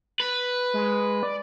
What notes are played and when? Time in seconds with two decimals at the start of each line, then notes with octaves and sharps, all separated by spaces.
0.20 B4
0.74 G#3
1.23 D5